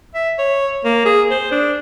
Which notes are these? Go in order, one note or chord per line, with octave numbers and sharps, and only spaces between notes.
E5
C#5
A#3
G#4
C5
D4